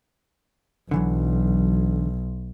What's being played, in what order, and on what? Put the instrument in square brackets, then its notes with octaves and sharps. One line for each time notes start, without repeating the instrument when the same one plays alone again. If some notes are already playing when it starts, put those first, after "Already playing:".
[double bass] B1 [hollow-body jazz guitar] D3 E3 F#3